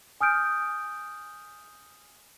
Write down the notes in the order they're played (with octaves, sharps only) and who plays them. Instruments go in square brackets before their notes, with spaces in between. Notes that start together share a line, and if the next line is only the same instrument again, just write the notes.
[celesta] G#5 D#6 F6 G6 D7